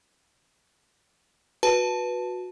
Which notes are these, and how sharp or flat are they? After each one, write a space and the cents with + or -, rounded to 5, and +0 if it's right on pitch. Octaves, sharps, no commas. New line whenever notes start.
F#4 -20 B4 -10 A5 +0